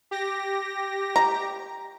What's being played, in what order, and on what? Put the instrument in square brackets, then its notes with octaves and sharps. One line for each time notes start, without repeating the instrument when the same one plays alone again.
[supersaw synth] G4 A#6
[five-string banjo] A#5